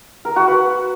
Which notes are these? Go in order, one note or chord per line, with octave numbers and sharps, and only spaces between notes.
A#4
F#4
B4